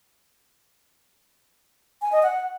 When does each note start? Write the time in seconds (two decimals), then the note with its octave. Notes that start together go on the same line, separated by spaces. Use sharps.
2.02 G#5
2.12 D#5
2.23 F#5